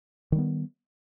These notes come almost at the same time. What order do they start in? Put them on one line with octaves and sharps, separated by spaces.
D#3 G3 B3